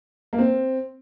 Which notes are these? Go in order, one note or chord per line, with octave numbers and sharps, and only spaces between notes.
A#3
C4